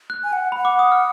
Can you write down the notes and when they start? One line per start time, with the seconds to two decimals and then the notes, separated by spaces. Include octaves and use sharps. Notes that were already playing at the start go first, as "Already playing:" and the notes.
0.10 F#6
0.24 G#5
0.33 F#5
0.52 F#5 B5
0.65 D6
0.79 D#6
0.92 F6